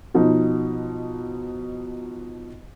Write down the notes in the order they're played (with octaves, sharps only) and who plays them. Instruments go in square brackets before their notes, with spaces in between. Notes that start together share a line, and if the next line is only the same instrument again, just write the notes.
[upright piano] B2 F3 D#4